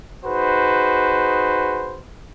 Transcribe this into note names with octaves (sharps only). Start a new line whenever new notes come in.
D#4 F#4 G#4 B4 C5